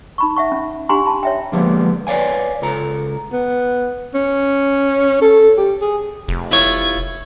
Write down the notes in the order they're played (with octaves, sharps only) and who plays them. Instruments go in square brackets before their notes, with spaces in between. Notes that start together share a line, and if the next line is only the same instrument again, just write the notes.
[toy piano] D#4 B5 C#6
E5 F#5 C#6
C#4
D4 G4 F#5 G#5 A#5 C6
A5 B5
C#5 E5 G5
[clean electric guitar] D3 F3 G3 G#3 A#3 B3
B4 C#5 D5 F5 G#5
C#2 F4 A4 A#5
[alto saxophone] B3
C#4
A4
G4
G#4
[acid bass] F1
[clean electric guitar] E4 F4 C#5